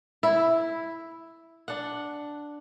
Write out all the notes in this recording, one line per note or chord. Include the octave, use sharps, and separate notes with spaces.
E4
D4 F#5